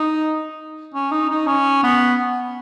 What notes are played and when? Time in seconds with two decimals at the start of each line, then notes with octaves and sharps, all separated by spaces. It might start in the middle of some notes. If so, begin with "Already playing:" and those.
Already playing: D#4
0.94 C#4
1.12 D#4
1.30 D#4
1.47 C#4
1.83 B3